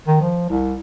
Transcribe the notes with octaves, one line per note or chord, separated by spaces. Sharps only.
D#3
F3
C2